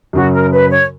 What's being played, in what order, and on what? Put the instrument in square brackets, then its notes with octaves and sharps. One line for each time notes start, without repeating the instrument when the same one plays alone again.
[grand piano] F#2 C#3 F#3 [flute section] F#4
[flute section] A#4
B4
C#5